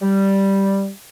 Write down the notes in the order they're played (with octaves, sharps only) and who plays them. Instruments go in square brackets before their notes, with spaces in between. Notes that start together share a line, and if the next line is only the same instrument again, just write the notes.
[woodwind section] G3